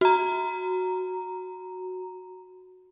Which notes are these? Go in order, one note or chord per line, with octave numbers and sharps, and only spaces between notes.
F#4 A#5